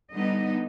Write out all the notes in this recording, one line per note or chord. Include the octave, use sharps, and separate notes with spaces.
D3 G3 B3 D#4 D#5